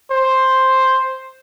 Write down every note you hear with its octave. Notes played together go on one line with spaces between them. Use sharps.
C5